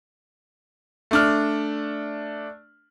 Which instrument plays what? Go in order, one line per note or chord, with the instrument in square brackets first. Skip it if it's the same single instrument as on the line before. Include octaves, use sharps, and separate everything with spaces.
[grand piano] A3 D4 F6